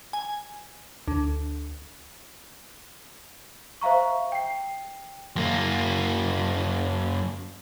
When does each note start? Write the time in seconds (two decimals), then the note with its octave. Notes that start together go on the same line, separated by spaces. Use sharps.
0.13 G#5
1.08 D2
3.81 C5 E5 F5 A#5 C#6
4.32 G5 C7
5.36 F#2 A#3